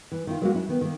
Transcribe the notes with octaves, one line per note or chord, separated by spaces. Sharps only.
E3
D#3 E4 F4
F#3 G#3 A#3 D#4 F4 F#4
F#3 C#4 E4
D#3 B3
D#3 A#3